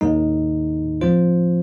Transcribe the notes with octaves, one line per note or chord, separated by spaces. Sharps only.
D#2 D#3 G#3 D#4
F3 C4 F4 C5